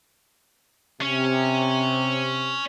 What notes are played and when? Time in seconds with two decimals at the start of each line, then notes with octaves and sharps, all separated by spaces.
1.01 C3 C#4